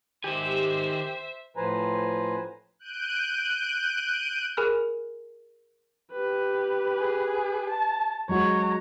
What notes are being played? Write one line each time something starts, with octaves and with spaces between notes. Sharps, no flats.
D#3 G4 C5 E5 G#5
A2 F3 B4 C5 G#5 A#5
F#6 G6 D7 D#7
G#4 A#4 G#5 B5 F6 F#6
G4 B4
G#4
A5
F#3 G#3 F#4 C#5 A#5